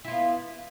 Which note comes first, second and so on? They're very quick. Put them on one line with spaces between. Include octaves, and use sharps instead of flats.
E4 F4 B3